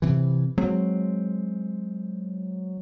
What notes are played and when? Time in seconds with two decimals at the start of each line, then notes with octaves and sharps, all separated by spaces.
0.02 C3 E3
0.58 F#3 G#3 C4